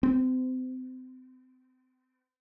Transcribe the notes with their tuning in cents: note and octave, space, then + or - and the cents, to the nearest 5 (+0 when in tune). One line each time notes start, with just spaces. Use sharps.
C4 -35